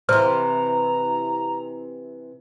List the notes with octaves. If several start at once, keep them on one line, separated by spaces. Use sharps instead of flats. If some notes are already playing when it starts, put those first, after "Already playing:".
C3 E3 C5 A#5 F6